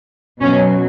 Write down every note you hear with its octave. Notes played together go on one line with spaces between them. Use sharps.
B2 F#3 C#4